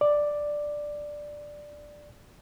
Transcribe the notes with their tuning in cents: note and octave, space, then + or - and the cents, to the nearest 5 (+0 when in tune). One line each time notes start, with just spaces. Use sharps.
D5 +5